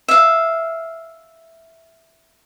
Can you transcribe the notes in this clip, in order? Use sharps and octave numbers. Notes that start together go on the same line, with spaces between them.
E5 F5